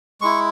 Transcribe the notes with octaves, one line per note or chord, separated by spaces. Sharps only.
G#3 E4 C#6